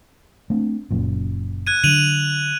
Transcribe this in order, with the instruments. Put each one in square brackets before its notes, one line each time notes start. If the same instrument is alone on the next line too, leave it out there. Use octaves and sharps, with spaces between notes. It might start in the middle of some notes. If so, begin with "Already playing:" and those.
[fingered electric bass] A3 C4 D4
F#1 F#2 A#2
[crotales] F#6 G#6 D#7
[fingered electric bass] D3 F#3 [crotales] D#7 F7 F#7